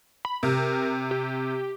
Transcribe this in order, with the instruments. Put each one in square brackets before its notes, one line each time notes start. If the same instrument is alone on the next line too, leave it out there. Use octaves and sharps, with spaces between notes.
[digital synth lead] B5
[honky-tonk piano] C3 [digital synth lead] A#4
[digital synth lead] G4